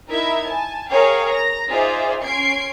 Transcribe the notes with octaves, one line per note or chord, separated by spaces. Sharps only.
D#4 E4 A#4 E5 G#6
G#5 A5
G#4 A#4 C#5 F5 G5
A#5 A#6
D#4 F4 G#4 C5 D5 E5
C#4 C6 G#6 C7 D7